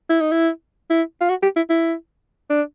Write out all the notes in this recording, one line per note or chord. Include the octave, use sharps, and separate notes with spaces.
E4
D#4
E4
E4
F4
F#4
G4
E4
E4
D4